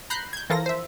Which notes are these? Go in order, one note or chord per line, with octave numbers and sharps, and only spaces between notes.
A#5 B5 F#6 G6 C7
G6 G#6
E3 F3 F4 A4 A#4 A#6
C5 E5